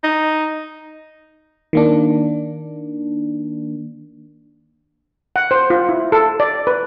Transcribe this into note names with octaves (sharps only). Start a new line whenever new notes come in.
D#4
D#3 A#3 D4
F#5
C5
F4
E4
A4
D5
B4